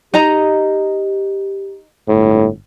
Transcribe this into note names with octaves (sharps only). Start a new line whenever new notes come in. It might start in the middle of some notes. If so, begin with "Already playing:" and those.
D#4 G4 D#5 A#5
G1 A2